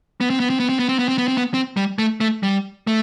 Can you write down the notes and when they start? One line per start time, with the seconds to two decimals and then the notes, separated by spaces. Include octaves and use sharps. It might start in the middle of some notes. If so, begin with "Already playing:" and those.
0.21 B3
0.30 C4
0.40 B3
0.50 C4
0.60 B3
0.69 C4
0.79 B3
0.89 C4
0.99 B3
1.08 C4
1.18 B3
1.28 C4
1.38 B3
1.54 C4
1.77 G3
1.99 A3
2.20 A3
2.43 G3
2.87 A3